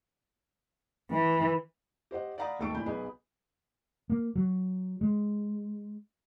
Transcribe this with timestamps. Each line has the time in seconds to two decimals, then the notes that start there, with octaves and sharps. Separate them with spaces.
1.11 E3
2.11 G4 C5 D#5 F#5
2.38 D5 F5 F#5 A#5 B5 D#6
2.59 G#1 D#2 A4 A5 C#6 D7
2.74 A#2 E3 B5 G6
2.86 B1 B3 G#4 B5
4.10 A#3
4.36 F#3
5.01 G#3